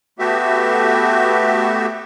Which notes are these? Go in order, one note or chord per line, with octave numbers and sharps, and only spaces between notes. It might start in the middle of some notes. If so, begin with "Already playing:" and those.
A3 B3 F#4 G4 E5